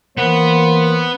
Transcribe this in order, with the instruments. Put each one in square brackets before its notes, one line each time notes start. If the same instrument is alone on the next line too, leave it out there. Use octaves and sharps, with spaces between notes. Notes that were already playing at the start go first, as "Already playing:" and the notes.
[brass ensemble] E3 A#3 C5 [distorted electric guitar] B3